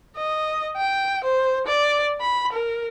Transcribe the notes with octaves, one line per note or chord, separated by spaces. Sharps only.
D#5
G5
C5
D5
B5
A#4